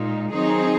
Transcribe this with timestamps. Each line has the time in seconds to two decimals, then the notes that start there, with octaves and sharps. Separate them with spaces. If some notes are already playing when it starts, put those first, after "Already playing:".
Already playing: A#2 G#3 D#4
0.31 D#3 F#3 C4 D#4 G#4